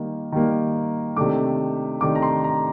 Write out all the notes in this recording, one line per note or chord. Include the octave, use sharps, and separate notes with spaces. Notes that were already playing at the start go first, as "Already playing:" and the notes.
Already playing: D#3 G3 A#3
D#3 G3 A#3
C3 D#3 A3 D4 D6
C3 D#3 A3 D4 D6
A#5
C6
A#5